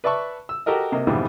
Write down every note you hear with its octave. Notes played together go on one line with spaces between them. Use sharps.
B4 D5 E5 A5 C#6
E6
F#4 G4 A4 A#4 D#5
C3 A#3 D#5
F2 G#2 B2 D3 E3 G3